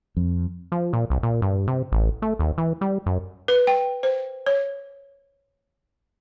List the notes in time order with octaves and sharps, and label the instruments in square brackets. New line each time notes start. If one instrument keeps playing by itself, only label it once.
[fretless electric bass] F2
[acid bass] F3
A#2
C2
A#2
G2
C3
A1
A3
D#2
E3
G3
F#2
[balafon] B4
G5
C5
C#5